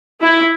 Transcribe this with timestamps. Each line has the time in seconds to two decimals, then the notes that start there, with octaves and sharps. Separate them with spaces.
0.21 E4